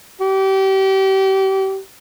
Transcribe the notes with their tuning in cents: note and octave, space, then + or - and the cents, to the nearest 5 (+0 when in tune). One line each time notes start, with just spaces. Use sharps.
G4 -30